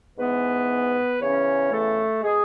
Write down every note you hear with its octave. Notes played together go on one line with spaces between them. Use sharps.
G#2 E3 B3 B4
E2 C#3 E3 C#4 C#5
A3 A4
B2 G#3 G#4